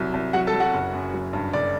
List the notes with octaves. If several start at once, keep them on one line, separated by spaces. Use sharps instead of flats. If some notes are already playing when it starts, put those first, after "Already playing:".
Already playing: C2 F#3
C2
F#3 F#4 F#5
A4 A5
F#3
F#4 F#5
F#1
F#2
F#3
G2
F#1 D5